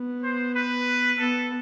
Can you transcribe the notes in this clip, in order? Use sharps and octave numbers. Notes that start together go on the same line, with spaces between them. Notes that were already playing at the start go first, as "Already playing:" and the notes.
Already playing: B3
C5
B4
B3 A4